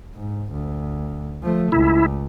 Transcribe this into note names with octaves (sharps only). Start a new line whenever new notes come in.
G#2
D2
F3 A3
C#2 E4